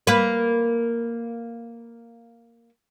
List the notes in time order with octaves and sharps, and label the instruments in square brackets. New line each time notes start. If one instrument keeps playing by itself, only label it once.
[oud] A#3 B4